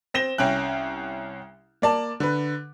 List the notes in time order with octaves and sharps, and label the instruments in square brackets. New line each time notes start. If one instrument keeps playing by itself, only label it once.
[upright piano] C4 A#6 E7 G7
C2 C#4 G5 F#6
A#3 D5 A5
D3 B4